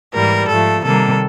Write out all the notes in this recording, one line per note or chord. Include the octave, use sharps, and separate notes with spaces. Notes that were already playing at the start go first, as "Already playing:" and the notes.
G#2 E3 G3 A#3 A#4
G#2 F3 A3 A4
C3 D#3 G3 A#3 A4